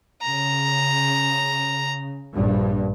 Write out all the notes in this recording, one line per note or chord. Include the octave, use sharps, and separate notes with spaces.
C#3 A#5
A#1 G2